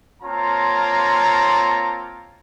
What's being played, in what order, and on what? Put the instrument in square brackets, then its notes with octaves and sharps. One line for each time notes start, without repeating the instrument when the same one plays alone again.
[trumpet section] A#3 C4 F4 C#5 A5 A#5